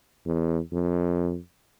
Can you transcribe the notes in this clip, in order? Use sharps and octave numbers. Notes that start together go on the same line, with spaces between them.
E2
F2